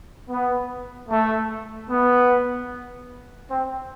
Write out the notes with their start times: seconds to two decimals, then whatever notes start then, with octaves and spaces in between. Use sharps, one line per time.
0.29 B3
1.09 A3
1.89 B3
3.50 C4